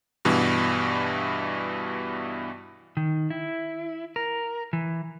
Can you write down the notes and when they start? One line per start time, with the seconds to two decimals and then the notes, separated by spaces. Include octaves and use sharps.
0.25 G2 B2 E3
2.97 D#3
3.30 E4
4.16 A#4
4.73 E3